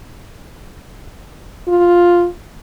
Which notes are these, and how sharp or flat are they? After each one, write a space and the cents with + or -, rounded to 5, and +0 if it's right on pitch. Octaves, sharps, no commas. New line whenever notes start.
F4 +5